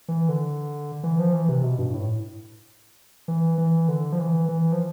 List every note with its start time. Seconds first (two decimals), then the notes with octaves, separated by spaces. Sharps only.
0.08 E3
0.29 D3
1.03 E3
1.19 F3
1.33 E3
1.49 C3
1.64 B2
1.78 G2
1.94 A2
3.28 E3
3.58 E3
3.88 D3
4.13 F3
4.19 E3
4.49 E3
4.72 F3